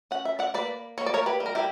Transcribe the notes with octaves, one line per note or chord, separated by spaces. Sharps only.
C#4 F#5
E5
D5 F#5
A#3 B4 D5
A#3 C#5
D5
A#4 C#5
G4 B4
G3
A#4
E4 G4